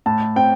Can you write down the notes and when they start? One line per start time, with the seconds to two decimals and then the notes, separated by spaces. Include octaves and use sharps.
0.06 A2 A5
0.36 C4 G5